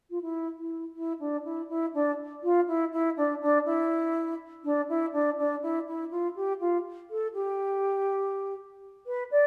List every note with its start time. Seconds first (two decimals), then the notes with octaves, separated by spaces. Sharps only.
0.10 F4
0.22 E4
0.58 E4
0.96 E4
1.19 D4
1.45 E4
1.69 E4
1.94 D4
2.43 F4
2.67 E4
2.93 E4
3.17 D4
3.41 D4
3.65 E4
4.64 D4
4.89 E4
5.13 D4
5.38 D4
5.62 E4
5.87 E4
6.11 F4
6.36 G4
6.60 F4
7.10 A4
7.34 G4
9.06 B4
9.31 D5